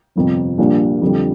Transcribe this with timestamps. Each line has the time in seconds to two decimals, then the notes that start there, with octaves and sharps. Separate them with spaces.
0.16 G1 F2 C3
0.58 A#1 A#2 G3 D4 F4
1.02 F2 D3 G3